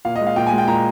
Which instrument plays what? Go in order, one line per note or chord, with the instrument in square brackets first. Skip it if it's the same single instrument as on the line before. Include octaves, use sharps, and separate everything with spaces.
[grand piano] A#2 F5
D#5
G#3
F5
A#2 G5
G#5
G#3
G5
A#2 A#5